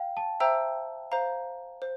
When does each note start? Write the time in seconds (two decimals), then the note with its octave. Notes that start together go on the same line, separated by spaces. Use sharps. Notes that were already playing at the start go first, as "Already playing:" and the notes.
Already playing: F5 G5
0.17 A5
0.40 C5 E5 G5 A#5 E6
1.12 C5 F5 A#5
1.82 C5